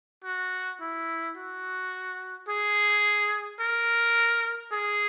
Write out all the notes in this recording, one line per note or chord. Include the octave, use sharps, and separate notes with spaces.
F#4
E4
F#4
G#4
A#4
G#4